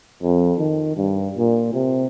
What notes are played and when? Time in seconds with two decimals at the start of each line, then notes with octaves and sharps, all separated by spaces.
0.22 F2
0.58 D#3
0.96 G2
1.37 A#2
1.73 C3